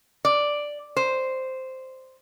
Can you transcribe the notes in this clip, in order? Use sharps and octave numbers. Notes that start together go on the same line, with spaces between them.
D5
C5